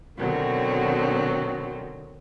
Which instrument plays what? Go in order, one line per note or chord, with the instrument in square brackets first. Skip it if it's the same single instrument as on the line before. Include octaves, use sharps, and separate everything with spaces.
[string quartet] B2 D3 D#3 F#3 C4